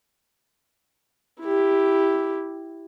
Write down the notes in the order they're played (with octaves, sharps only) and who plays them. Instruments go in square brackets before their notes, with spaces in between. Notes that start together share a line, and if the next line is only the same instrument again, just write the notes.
[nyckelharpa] E4 G4